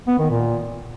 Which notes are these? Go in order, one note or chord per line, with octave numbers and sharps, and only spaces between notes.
B3
D#3
A#2